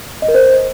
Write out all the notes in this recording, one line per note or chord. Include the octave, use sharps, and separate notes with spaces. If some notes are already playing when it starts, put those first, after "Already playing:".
D#5
A#4
C5